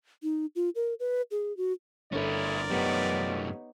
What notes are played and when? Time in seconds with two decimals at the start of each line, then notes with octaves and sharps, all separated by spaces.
0.23 D#4
0.56 F4
0.75 A#4
1.00 B4
1.31 G#4
1.57 F#4
2.12 G1 C#4 E4 F4 A4 A#4 D5
2.70 F#2 A3 B3 D#4 G4 C#5